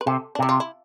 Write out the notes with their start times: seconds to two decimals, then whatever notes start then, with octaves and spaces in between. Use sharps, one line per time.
0.01 B4
0.06 C3 A4
0.35 D4
0.39 C3 E4
0.49 F4
0.60 E4